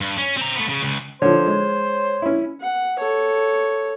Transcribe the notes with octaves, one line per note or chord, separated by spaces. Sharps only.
G2
C#4
C4 A#5
A3 B3
C#3
C#2 C#3
D3 F3 C5 C#5
G#3
C#4 E4
F#5
A4 C#5